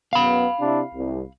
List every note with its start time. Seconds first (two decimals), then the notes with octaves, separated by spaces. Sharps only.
0.13 F#2 B3 F5 B5
0.60 C3 D4 E4
0.95 C2